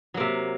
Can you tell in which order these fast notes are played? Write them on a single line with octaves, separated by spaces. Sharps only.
F#3 A#3 C3